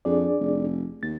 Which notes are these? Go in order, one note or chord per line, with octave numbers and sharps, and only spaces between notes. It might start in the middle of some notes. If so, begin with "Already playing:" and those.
F2 D4 G#4 D5
F1
D#2 A6